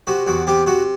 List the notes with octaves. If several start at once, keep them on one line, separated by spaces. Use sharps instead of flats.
C3 F#4
E2 F#4
C3 G4
C3 F#4